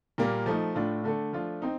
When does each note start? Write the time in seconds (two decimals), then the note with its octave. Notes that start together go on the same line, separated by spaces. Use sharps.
0.18 A#2 G3 A#3
0.46 F3 A3 D#4
0.75 A2 A3 D4 F4
1.04 D3 A3 D4 A4
1.33 F3 A3 D4 F4
1.62 C4 D#4